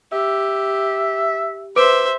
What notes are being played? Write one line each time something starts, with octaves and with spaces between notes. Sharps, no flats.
G4 E5
B4 C5 E5 D6 D7